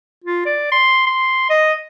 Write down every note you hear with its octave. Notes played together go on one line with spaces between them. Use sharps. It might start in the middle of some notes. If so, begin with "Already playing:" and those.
F4
D5
C6
C6
D#5